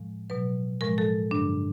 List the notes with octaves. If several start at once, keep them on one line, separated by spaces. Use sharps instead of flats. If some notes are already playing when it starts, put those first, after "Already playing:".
Already playing: A2 F3 G#3
B2 F#3 B4
A2 F3 G#3 A#4
A4
G2 D3 F#3 D4